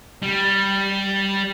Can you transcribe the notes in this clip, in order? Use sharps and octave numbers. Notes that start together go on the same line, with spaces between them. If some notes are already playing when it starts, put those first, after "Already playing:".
G3